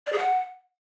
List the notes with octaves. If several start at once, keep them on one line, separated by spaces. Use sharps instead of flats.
D5
G#4
F#5